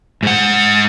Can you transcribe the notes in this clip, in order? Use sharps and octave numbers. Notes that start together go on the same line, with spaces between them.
G#2 F#5